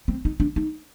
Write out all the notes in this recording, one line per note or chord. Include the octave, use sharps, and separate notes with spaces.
C4
D#4
D4
D#4